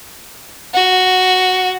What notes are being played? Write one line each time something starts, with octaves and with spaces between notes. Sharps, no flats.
F#4